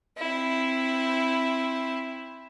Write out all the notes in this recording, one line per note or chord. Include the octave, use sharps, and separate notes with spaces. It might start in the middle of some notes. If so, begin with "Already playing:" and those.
C4 E4